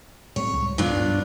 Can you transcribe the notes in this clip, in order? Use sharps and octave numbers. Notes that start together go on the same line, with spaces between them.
A2 G3 C4 C#5
C#2
F#1 G2 F3 B3 D4 F4